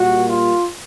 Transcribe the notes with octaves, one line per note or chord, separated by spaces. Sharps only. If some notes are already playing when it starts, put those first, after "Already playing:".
Already playing: A#2 G3 A#3 F#4
F4